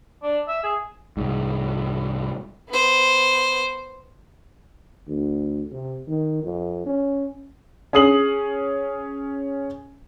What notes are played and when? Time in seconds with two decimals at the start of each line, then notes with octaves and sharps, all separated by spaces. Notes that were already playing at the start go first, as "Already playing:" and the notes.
0.23 D4
0.48 E5
0.63 G#4
1.17 C2 G#2
2.69 B3 C5
5.07 D2
5.72 C3
6.08 D#3
6.43 F2
6.86 C#4
7.93 C#4 G#4 D#6 C7 F#7